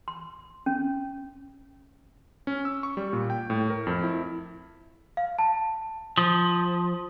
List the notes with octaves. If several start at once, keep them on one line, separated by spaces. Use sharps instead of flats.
C6
C#4
C#4
E6
C#6
G3
A#2
G5
A2
A#4
F2
E4
F5
A5
F3 D#6